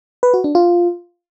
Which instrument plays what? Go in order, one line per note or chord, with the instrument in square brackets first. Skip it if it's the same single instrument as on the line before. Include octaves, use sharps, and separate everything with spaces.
[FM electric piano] B4
F#4
D4
F4